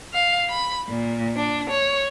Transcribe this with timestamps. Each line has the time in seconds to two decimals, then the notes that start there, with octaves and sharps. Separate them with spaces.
0.13 F5
0.50 B5
0.88 A#2
1.36 D4
1.71 C#5